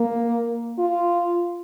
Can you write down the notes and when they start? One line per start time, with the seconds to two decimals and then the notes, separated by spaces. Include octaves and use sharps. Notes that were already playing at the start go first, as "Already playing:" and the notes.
Already playing: A#3
0.79 F4